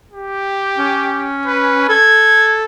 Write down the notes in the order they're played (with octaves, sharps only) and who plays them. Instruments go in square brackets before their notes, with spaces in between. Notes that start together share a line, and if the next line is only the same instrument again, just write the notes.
[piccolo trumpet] G4
[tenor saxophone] C#4
[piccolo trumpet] B4
[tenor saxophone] A4 [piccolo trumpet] G#6